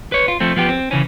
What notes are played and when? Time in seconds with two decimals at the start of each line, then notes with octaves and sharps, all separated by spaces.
0.12 B4 C#5
0.28 F4
0.40 F3 A3 C4
0.56 F3 B3 G4
0.69 C4
0.91 C#3 E3 C#4